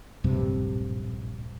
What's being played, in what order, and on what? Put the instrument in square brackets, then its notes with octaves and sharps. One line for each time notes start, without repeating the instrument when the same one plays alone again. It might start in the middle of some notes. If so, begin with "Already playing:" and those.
[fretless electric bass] D1 A#1 G2 C3